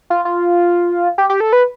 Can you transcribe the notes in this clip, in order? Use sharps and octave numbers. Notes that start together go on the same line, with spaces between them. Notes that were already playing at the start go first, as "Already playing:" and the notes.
F4
F4
G4
G4
A4
B4